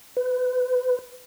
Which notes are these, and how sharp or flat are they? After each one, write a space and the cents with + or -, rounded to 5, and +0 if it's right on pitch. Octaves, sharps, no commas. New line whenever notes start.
B4 +30